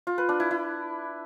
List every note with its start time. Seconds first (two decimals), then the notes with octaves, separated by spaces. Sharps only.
0.07 F4
0.18 B4
0.29 D4
0.40 E4
0.51 E4